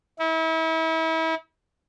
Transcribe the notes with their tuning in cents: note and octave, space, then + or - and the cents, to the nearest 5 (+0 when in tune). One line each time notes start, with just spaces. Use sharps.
E4 -35